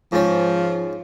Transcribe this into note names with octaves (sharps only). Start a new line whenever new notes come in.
G#2 F3 C#4